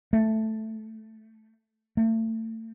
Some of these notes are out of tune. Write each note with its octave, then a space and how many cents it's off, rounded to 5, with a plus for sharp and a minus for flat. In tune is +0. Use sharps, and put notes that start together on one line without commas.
A3 +0
A3 +35